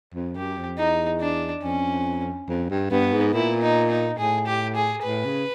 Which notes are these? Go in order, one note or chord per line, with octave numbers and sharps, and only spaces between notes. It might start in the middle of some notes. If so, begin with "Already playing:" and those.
F2
F#2 G4
F2
E2 D#4
D4
F2 C#4
F2
G2
G2 B3
G#2
A#2 E4
D#4
D#4
A2 G#4
G4
G#4
A2 B4
C#3